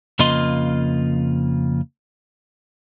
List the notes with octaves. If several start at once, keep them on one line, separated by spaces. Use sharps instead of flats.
F2 C#3 A#3 F4 D#5 C6